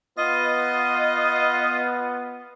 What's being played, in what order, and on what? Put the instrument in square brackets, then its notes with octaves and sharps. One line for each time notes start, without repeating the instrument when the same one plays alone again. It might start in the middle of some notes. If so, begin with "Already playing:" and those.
[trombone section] B3 [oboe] F4 [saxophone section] D#5